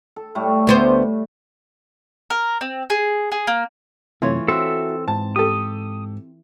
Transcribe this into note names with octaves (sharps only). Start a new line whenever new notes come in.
A4
A2 G3 A3
D2 B3 C5
A#4
C4
G#4
G#4
A#3
F#2 C3 E3 A3 F4 C#5
C4 E4 F#4 A4 E5 E6
G#2 A5
G4 A4 D#6